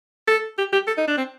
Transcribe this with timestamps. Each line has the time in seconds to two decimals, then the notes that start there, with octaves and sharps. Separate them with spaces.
0.27 A4
0.58 G4
0.73 G4
0.87 A4
0.97 D#4
1.07 D4
1.17 C4